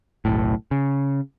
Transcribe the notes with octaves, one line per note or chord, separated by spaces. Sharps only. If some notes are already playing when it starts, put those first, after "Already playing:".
F#1 B1 A2
C#3